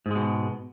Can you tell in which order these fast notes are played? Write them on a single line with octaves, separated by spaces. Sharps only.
G#2 G#3 B2